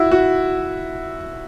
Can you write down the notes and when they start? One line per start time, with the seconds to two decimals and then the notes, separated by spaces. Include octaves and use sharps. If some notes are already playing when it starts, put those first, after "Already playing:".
Already playing: E4 F#4
0.11 F#4